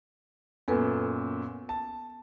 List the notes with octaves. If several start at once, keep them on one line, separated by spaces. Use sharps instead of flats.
F#2 A#2 B3 A4 B4
A5